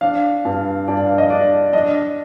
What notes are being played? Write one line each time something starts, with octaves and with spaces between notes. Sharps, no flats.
D4 F5
G2
G2 D5
F5
D#5
D4 D5
D4 D#5